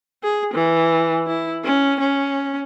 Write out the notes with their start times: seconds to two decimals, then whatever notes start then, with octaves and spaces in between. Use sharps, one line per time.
0.23 G#4
0.54 E3
1.27 E4
1.64 C#4
2.00 C#4